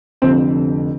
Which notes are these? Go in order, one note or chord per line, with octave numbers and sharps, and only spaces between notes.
F1 F2 D3 C4